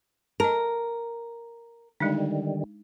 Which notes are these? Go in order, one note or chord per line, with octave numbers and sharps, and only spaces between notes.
A#4 D#5 A5
D3 D#3 G3 G#3 D4 D#4